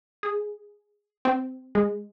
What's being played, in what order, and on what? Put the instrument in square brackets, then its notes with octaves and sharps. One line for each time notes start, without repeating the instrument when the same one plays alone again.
[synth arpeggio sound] G#4
C4
G#3